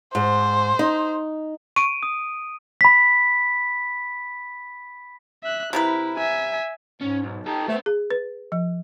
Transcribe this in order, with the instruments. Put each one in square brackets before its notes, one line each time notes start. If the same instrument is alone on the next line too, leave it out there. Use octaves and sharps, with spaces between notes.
[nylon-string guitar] G#2 [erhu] C5
[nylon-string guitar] D#4
[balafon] C#6 [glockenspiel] D7 D#7
[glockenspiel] D#6
B5 B6
[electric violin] E5 F#6
[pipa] C3 A#4 B4 [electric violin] E4
[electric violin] E5 G#5
[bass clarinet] G#2 [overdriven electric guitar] C#4
[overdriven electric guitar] B1
[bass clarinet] D#4 [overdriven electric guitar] G4 A4
[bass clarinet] A3 [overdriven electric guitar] B3 C4
[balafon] G#4
B4
F3